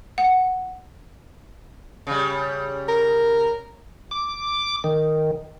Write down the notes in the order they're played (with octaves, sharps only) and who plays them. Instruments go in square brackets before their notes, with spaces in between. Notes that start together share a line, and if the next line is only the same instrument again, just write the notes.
[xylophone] F#5
[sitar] C#3 G3
[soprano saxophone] A#4
[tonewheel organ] D6
D#3